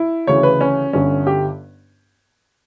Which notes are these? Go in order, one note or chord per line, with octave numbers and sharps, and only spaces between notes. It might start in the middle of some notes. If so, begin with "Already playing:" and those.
Already playing: E4
D2 C#3 E3 C#5
B4
C#4
G1 G2 D3 C#4
G4